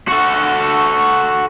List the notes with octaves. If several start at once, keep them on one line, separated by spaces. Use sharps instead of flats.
F#4 A4